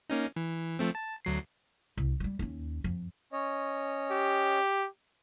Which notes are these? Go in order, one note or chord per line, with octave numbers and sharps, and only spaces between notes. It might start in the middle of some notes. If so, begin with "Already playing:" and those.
A#3 C#4 D#4
E3
F3 A3 C4
A5
D2 F#3 C7
C2
F#3 G3
D#2 C#4
F2
C#4 C#5 D#5
G4